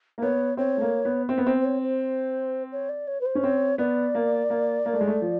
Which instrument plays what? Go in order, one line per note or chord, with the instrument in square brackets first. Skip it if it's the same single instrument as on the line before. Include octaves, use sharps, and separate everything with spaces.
[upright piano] A#3
[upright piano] B3 [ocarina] C#5
[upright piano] C4 [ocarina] C#5
[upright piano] A3
A#3
B3
[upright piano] C4 [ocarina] C5
[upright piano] B3
[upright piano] C4 [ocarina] C5
[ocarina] C5
C#5
C5
C#5
D5
C#5
B4
C5
[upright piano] C#4
[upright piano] C4 [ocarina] C#5
[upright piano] B3 [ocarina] D5
[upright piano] A#3
A#3
A#3
A3
G#3
A3
F3